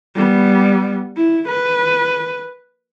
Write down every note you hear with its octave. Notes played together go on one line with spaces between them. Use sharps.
G3 B3
E4
B4